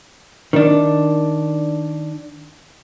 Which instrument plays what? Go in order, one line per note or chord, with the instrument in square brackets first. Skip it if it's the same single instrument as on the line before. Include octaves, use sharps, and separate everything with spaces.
[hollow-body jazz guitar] D#3 D4